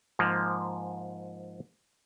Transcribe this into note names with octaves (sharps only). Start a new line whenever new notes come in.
G#2 F3 A#3